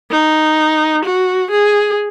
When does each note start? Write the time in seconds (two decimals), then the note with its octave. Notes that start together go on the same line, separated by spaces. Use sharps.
0.11 D#4
1.05 F#4
1.51 G#4